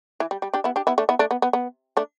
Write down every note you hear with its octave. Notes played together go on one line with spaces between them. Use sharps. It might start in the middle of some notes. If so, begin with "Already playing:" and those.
E3
G3
G3
D4 G4
B3 E4
D4 G4
B3 E4
A3 D4
B3 E4
A3 D4
B3
B3
B3
A3 D4